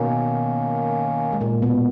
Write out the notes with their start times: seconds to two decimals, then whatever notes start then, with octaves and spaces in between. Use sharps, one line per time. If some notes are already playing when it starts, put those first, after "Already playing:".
Already playing: B2 D#3 A#3 B3 C#4
1.33 G#3
1.41 A#2 A#3
1.62 B2 B3